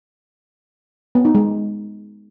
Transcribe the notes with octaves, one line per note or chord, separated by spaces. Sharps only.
B3
D#4
G#3